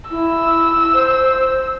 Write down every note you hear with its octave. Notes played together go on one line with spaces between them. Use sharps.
E4 E6
C5